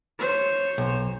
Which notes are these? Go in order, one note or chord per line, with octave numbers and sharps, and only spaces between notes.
C5 C#5
B1